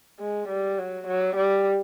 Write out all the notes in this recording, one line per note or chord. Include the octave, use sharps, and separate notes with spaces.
G#3
G3
F#3
F#3
G3